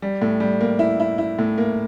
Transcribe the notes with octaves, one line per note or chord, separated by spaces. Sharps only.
G3
A2
G3
A#3
E4
E4
E4
A2
A#3